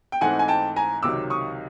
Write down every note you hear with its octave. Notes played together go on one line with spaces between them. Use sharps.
G5
G#2 E3 A3 C4 D#4 F#5 G#5
G#5
G5 A5
G#5 A#5
C#2 C3 D#3 F#3 D6 E6
C#6 D#6